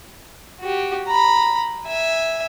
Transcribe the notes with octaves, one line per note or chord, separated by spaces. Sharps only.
F#4 G4
A#5 B5
E5 G#5